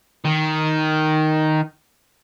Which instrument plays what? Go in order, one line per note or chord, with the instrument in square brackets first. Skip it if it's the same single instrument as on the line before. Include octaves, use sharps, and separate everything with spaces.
[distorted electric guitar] D#3